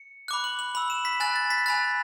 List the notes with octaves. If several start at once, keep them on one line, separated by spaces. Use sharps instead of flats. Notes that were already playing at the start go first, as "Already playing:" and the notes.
Already playing: C#7
B5 D6 F#6
F#7
F#7
B5 E6 F#7
E7
B6
G#5 B5 F#6 A6
A6
B6
G#5 B5 F#6 A6